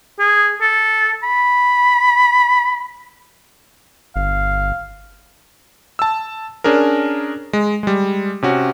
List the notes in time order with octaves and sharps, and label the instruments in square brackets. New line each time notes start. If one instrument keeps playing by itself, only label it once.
[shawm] G#4
A4
B5
[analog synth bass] G1 [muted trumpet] F5
[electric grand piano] A5 E6
C#4 D4 G#4 A#4
G#3
G3 G#3
C3 C#4 F#4